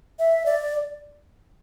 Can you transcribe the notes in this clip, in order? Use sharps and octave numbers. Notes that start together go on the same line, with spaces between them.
E5
D5